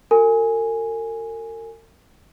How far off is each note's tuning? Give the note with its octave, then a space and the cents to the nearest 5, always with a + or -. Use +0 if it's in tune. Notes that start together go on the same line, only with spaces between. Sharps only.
F#4 -5 A#4 -45 G#5 +0